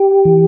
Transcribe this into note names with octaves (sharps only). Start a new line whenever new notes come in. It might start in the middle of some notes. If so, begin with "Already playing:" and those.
Already playing: G4
E3